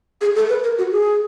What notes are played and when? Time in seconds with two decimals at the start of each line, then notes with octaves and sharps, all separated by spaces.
0.21 G#4
0.36 A4
0.49 B4
0.64 A#4
0.78 F#4
0.92 G#4